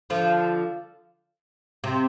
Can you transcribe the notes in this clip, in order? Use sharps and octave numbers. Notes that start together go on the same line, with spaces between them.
D3 F3
C3